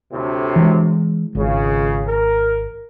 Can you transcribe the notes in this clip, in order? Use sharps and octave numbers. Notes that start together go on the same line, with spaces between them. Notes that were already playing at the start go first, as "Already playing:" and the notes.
D2 A2 C3
E3 G#3
G#1 C#2 C#3
A#4